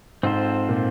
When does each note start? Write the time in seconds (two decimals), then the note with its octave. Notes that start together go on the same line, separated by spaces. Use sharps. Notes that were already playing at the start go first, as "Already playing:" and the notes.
0.23 G#2 C4 F4 A4 C5
0.69 A#2